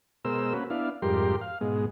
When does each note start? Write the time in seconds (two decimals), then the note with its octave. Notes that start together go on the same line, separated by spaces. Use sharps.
0.25 B2 G#3 A#4 C5 E6
0.53 A#3 C#4 F#4 B4
0.70 B3 D4 E4 F5
1.02 F2 G#2 G3 G4 A#4 C6
1.41 F5
1.61 G#2 B2 G#3